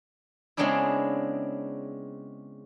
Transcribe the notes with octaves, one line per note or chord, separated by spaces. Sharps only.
C#3 G#3 B3 C4 D4 E4